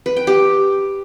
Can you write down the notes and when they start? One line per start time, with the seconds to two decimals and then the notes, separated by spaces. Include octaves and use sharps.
0.06 B4
0.16 G5
0.27 G4